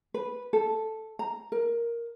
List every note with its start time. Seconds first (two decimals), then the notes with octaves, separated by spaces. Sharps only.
0.14 B4
0.53 A4
1.19 A#5
1.52 A#4